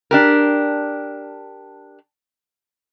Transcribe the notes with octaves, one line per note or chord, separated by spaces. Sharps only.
D4 G4 A#4